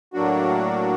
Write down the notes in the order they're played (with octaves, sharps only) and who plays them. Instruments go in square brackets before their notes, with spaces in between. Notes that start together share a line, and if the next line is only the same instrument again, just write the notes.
[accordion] A2 F#3 A#3 D4 F#4